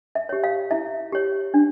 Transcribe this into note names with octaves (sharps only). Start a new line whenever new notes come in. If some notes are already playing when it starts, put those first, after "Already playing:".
E5
G4 C#5
F5
E4 E5
G4 C#5
D4